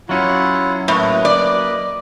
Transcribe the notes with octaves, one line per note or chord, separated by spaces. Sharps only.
F#3 C#4 E4 F4 F#5
A2 A#3 B4 D#5
D5